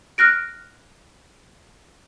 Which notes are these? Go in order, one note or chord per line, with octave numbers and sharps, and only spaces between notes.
F6 F#6 A#6 D7